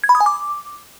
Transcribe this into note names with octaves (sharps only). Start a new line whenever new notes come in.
G#6
B5
D#6
G#5
D6